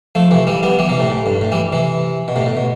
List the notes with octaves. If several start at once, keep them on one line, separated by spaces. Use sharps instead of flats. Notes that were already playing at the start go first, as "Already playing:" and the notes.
F3 A3
C3 E3
E3 G3
G3 B3
E3 G3
C3 E3
A2 C3
A2
G2
A2
E3 G3
C3 E3
B2
A2 C3
A2
B2